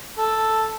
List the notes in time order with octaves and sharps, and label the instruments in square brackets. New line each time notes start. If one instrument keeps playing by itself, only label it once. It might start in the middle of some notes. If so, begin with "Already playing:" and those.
[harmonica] A4